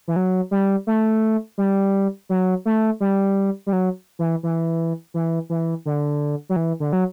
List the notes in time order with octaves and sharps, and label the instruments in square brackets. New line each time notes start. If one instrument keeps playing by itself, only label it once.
[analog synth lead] E3
F#3
G3
A3
G3
F#3
A3
G3
G3
F#3
E3
E3
E3
E3
D3
F#3
E3
D3
F#3